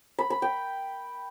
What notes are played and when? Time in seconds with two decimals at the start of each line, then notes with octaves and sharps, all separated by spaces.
0.19 B5
0.30 B5
0.42 G5